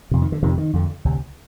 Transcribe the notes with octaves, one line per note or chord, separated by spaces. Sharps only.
F2 C3
D#3
D3
F2 C3 D#3
D#3
F2 D3
D2 C3